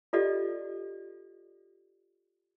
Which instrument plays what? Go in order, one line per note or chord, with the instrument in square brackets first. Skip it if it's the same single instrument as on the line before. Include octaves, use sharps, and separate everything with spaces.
[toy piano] F4 G4 A4 D5 D#5